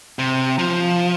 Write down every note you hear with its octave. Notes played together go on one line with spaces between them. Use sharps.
C3
F3